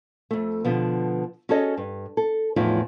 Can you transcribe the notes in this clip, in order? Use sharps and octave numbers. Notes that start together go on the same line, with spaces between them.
F2 A3
B2 D3 F3 B3
C#4 F#4 G#4 A4 C#5 D#5
G2
A4
E2 A2 F3 D#4 F4 C#5